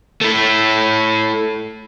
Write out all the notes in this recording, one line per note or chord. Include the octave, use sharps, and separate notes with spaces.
A3 E4